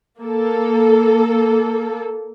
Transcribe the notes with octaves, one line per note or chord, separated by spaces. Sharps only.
A#3 A4